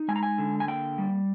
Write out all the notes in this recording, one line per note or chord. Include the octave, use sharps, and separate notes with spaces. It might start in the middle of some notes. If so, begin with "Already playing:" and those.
Already playing: D#4
G#3 G#5
A#5
G#5
D3
G#5
A#3 G5
G3